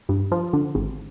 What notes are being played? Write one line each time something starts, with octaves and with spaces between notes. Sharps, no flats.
G2
F3
D3
G#1